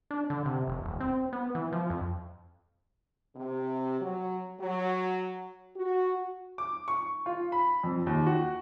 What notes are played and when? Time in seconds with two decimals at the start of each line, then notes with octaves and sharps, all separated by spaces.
0.11 D4
0.30 D3
0.45 C3
0.68 F1
0.84 D#1
1.00 C4
1.33 B3
1.55 E3
1.73 F3
1.90 F2
3.35 C3
4.01 F#3
4.60 F#3
5.76 F#4
6.58 D6
6.88 C#6
7.26 F4
7.52 B5
7.83 F2
8.07 D#2
8.27 F#4